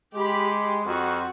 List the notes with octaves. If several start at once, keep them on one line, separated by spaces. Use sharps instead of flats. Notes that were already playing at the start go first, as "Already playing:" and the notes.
G#3 G4 B5
F2 F#4